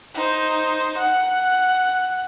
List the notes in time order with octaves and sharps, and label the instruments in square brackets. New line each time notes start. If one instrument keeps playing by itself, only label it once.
[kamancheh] D#4 C5
F#5